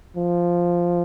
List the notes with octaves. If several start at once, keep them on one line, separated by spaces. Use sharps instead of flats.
F3